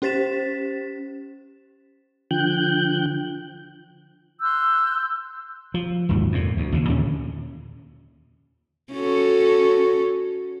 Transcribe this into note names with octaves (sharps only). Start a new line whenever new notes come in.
C#4 G4 C5 A6 B6 E7
D3 F3 G5 F#6 G6
C6 E6 F#6 G6
F3
G1 D#2 G#2 F#3
F2 A#2
D2
D#2 C#3
D#2 A#2 D3 C#4
C#4 F#4 A4